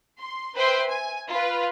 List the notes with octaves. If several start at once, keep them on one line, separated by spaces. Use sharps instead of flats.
C6
B4 C5 E5 G5 C6
G#5
F4 B4